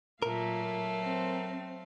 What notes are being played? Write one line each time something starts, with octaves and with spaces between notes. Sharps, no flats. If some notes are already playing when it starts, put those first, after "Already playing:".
A#2 F#3 A3 A#4 F5
C4